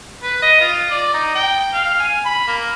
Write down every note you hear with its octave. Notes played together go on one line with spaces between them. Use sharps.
B4
D#5
F4
D5
D#4
G5
F5
G#5
B5
A#3